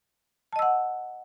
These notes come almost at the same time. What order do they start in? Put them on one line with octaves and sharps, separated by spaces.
A5 D#5 E6 F#5